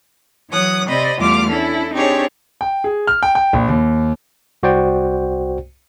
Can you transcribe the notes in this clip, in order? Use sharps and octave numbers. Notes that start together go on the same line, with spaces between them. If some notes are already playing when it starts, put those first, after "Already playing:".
E3 F#3 C#5 D#6 F#6
C3 C4 D5 D#5 B5
E2 G3 A3 F4 D6 F6
C#4 D4 E4 A4
C4 D4 D#4 G4 G#4 C#5
G5
G#4
F6
G5
G5
A#1
D#2
C2 F#4 C5 D5 G5